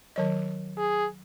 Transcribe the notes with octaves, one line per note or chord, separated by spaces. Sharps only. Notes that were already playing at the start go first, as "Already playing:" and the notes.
D#3 F#3 D#5
G#4